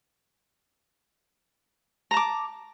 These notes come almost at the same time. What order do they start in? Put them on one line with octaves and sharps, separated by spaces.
A#5 A5 D6